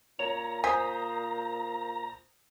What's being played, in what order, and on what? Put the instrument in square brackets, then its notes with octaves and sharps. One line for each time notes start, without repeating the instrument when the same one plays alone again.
[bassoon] A#2 [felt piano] C#5 [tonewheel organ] A#5
[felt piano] C5 D#6 B6 [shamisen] G#5